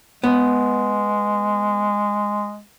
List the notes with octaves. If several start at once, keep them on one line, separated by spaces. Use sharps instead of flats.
G#3 B3